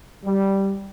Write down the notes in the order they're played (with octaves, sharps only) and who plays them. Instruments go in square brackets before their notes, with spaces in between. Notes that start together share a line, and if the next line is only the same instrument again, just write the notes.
[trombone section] G3